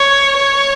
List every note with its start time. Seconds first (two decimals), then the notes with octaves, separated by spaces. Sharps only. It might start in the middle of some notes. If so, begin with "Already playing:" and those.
Already playing: C#5
0.37 C#5